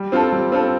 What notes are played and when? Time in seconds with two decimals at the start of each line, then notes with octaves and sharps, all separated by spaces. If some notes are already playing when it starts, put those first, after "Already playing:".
Already playing: G3
0.12 C4 F4 A4
0.32 G3
0.52 C4 F4 A4